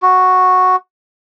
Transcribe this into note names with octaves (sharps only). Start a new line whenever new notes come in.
F#4